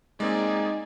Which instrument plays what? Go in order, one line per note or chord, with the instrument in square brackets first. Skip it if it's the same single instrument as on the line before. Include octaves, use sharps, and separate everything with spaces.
[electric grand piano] G#3 A#3 C4 [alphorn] D#4 [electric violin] G#4 D5